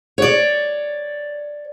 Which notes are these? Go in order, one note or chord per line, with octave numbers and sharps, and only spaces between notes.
C#5 D5